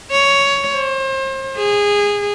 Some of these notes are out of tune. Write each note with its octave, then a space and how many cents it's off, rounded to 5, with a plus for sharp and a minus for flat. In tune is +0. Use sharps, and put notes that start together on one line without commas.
C#5 +10
C5 +35
G#4 -20